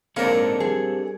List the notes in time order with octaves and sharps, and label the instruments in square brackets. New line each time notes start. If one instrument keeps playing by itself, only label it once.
[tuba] G#2 [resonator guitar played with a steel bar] A#3 D5 [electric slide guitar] C4 D4 A4 [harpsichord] A#4 C#5
[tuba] G3 [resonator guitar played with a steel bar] G#4